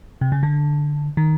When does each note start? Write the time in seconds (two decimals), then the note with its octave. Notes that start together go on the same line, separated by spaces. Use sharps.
0.21 C3
0.32 C#3
0.43 D3
1.17 D#3